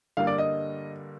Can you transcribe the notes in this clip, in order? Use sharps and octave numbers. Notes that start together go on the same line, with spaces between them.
G2 D3 G3 A#3 F5
D5
D#5